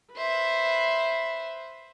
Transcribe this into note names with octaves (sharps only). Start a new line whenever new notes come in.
B4 C5 E5